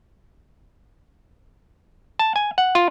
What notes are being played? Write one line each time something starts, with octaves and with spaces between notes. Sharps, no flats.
A5
G#5
F#5
F4